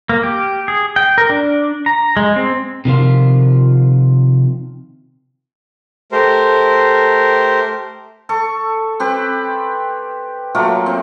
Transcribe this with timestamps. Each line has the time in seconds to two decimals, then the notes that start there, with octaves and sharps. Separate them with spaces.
0.09 A#3
0.23 G4
0.68 G#4
0.96 G5
1.18 A#4
1.30 D4
1.86 A#5
2.17 G#3
2.36 C4
2.85 C3 D#3 F3 F4
6.12 A3 G4 A#4 C5
8.29 A4 C#6
9.00 C4 G4 B4
10.55 F#3 A3 A#3 F4
10.86 C4